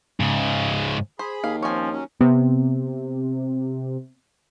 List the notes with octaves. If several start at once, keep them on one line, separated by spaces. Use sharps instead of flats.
G#2 C#3
G#4 C5 B5
D#2 F5
F3 C4 C#4 C#5 G#5
C#4
F#3 C#4
C3 B3